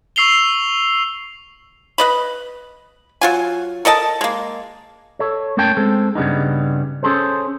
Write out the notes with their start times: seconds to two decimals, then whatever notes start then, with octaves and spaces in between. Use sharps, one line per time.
0.16 C#6 E6 C7 F7 G7
1.98 B4 D#5 B5
3.21 F#3 F4 G#5
3.85 A4 A#4 D#5 A5
4.21 G#3 A#3
5.19 A4 C#5
5.57 A3 A#3 C#4 C#5 G5 A5
5.77 G#3 C4 A4
6.15 G2 C#3 G3 B3 D#4
7.03 C#4 G#4 A4 C5